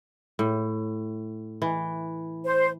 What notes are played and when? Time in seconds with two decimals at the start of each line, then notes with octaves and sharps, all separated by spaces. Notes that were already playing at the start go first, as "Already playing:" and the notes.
0.39 A2
1.62 E3
2.45 C5